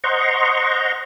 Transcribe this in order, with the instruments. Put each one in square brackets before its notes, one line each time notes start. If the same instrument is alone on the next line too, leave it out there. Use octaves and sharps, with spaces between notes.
[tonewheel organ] C5 D#5 F#5 A#5 C6 C#6